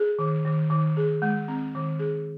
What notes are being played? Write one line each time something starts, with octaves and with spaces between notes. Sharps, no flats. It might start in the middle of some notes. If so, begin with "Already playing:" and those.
Already playing: G#4
D#3
D#3
D#3
G#4
G#3
C4
D#3
G#4